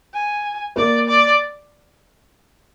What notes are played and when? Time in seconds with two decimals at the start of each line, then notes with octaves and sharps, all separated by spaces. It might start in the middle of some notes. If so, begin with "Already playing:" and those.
0.14 G#5
0.76 A#3 D5
1.08 D5